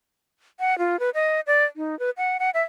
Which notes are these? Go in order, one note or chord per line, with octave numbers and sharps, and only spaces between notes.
F#5
F4
B4
D#5
D5
D#4
B4
F#5
F#5
E5